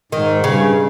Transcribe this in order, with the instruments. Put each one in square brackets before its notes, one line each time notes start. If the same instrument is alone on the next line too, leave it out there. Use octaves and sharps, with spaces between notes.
[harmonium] G#2 [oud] D#3
[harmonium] G2 [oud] C#3